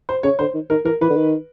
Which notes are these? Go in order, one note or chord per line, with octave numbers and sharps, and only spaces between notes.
C5
C#3 C#5
D3 C5
D#3
D#3 A#4
E3 A#4
E3 B4
D3
D#3